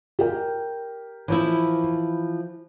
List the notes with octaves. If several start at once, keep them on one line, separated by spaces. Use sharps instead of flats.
G4 A#4 G5
E3 F3 E4